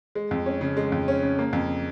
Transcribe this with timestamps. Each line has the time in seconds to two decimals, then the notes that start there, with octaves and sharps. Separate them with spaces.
0.15 G#3
0.31 F2
0.46 C#4
0.61 C#3
0.77 G#3
0.92 F2
1.08 C#4
1.23 C#3
1.39 A#3
1.53 F2